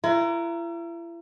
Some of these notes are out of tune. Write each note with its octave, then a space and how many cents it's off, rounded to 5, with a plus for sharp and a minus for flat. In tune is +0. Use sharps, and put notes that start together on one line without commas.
E4 +40 A#4 +0 F#5 +0